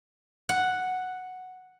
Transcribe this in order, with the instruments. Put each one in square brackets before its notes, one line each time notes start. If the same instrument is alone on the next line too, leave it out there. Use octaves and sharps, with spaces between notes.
[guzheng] F#5